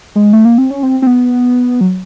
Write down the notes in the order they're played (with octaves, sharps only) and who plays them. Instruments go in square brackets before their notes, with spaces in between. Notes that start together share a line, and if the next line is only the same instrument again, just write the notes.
[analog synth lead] G#3
A3
A#3
C4
C#4
C4
C4
B3
F#3